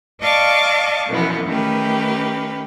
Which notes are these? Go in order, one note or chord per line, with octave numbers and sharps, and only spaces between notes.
D5 D#5 F5 A5 C#6 D6
F#2 B2 E3 F3 B3
D#3 A3 C#4 G4 B4